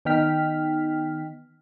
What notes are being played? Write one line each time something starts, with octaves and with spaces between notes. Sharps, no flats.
D#3 B3 D#4 G5 F6 B6